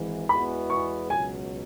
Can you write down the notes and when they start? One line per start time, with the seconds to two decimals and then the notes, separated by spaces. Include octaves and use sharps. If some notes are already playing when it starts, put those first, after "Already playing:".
Already playing: G#1 G#2 E3
0.29 E2 E3 G#3 B3 F#4 B5
0.70 C#6
1.10 C#2 B2 F#3 G#5